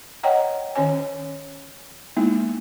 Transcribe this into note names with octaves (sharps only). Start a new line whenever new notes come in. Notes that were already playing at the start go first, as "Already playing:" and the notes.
C#5 D#5 F#5 G5 A#5
D#3 C#4 C#5 G#5
G#3 A#3 B3 D#4 E4